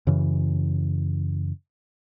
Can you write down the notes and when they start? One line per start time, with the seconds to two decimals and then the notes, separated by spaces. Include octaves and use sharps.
0.07 F#2 C#3 E3